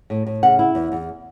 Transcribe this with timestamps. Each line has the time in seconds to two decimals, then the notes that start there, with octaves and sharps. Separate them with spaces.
0.10 A2
0.27 A2
0.43 C#3 F#5
0.59 E4
0.75 E2
0.92 E2